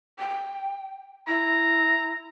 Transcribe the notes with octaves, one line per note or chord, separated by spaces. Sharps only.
G5
E4 A#5